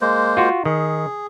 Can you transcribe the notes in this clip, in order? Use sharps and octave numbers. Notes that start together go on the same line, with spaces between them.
G#3 A#3 C5
F4 F#4
D#3 G#4